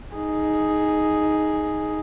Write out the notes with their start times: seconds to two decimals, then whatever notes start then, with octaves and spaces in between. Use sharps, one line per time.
0.15 D#4 G#4